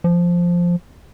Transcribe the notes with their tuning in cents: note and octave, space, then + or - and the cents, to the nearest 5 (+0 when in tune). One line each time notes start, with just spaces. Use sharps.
F3 +0